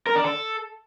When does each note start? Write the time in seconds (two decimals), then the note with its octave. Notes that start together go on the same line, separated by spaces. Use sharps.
0.07 A#4
0.15 D4
0.24 A4